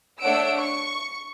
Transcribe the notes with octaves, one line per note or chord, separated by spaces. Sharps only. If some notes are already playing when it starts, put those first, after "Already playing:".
A3 D4 C#5 F#5 E6 D7
C#6